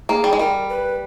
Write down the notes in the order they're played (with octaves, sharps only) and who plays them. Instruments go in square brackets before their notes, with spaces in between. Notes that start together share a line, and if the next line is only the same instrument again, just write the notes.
[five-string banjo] A#3 [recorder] G#4
[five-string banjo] G3
G#3
[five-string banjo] G3 [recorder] A#4
[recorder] B4